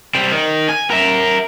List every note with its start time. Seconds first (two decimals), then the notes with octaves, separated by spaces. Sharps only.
0.15 G3 C4
0.32 D#3
0.69 G#5
0.90 A#4 E5